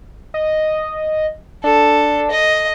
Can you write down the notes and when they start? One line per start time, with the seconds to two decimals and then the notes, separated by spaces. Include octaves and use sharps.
0.34 D#5
1.64 D4 A4
2.30 D#5